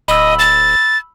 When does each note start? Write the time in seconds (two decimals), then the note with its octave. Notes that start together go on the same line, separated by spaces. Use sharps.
0.08 D1 D#5 B5 E6
0.39 A6